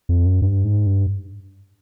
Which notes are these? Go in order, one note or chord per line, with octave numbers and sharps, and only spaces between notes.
F2
F#2
G2
G#2
G2